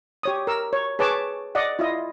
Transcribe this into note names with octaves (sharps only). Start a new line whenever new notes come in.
G4 C#5 D#6
A#4 E6
C#5
G#4 B4 C#5 A5 D6
D5 D#5 F#5
E4 F4 D#5